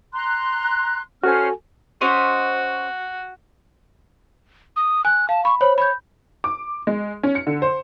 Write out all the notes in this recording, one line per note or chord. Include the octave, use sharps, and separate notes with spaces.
A#5 C6 F#6
C#4 F#4 A4 C5 G#5 F6
C#4 F#4 C5 D#5
D#6
G#5 F#6
F5 A5
B5 C#6
C5 C#5 B5
C#5 B5 G6
D6
G#3
C#4
C#7
D3
C5